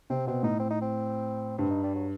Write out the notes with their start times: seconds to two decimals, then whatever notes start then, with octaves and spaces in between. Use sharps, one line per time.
0.10 C3 C4
0.27 B2 C4
0.43 A2 D#4
0.60 C4
0.70 D#4
0.82 C4
1.58 G2 C4
1.71 D#4
1.83 G3
1.95 F#3